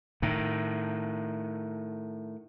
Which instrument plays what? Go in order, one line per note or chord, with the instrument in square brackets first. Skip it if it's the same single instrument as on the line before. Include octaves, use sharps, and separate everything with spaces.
[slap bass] A2 D#3